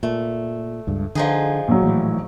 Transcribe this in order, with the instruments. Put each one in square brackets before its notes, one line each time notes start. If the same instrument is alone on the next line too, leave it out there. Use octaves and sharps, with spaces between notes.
[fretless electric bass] A#2 [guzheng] A3
[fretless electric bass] C#2 G2
[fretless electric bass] D3 [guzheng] F3 D#4 G#4
[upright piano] A#1 F#3
[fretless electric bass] A2 E3